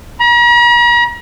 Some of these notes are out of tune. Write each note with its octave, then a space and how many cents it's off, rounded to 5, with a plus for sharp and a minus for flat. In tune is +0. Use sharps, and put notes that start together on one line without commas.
A#5 +45